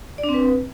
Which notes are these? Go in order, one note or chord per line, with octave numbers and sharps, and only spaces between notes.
D5
D4
C4
B4